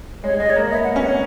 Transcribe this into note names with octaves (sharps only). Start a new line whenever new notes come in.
G#3 C#5
G#3 D#5
C#5
A#3
B3 E5
F#5
C#4 E5
C#5